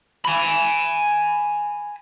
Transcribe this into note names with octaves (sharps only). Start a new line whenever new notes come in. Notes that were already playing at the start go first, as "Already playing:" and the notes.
G#5 B5